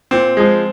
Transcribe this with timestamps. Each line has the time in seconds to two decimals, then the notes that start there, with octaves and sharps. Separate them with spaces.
0.11 A#2 C4
0.37 F3 G#3